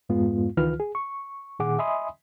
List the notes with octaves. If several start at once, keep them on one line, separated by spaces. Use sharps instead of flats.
F2 G#2 G#3 B3 F4
C#2 D#3 E3 F4 B4 F6
G#4
C#6
A#2 D#3 G#4 F#5 D6
D#5 E5 G#5 B5 C6 D#6